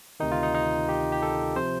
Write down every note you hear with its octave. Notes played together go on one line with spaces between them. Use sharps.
D2 C3 D#3 D#4
F4
D#4
D#4
G4
G4
A4
C3 F3 C5